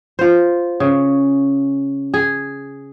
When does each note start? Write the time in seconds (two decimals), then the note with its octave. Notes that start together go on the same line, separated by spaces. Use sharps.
0.19 F4 C5
0.80 C#3
2.14 G#4